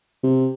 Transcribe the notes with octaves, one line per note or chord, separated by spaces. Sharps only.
C3